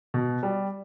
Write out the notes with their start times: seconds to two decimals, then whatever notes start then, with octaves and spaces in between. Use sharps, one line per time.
0.14 B2
0.43 G3